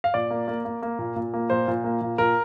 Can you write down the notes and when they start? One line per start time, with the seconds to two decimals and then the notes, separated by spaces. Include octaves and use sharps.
0.04 F5
0.14 A#2 D5
0.31 A#3
0.48 A#3
0.65 A#3
0.82 A#3
0.99 A#2
1.16 A#2
1.34 A#3
1.50 A#2 C5
1.68 A#2
1.84 A#3
2.01 A#2
2.18 A#2 A#4